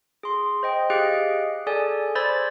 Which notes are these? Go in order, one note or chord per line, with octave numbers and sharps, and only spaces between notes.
G#4 C6
C5 D#5 G5
G4 G#4 D#5 F5 F#6 D7
G#4 A4 D5 G#5
C5 D5 B5 E6 G#6 A6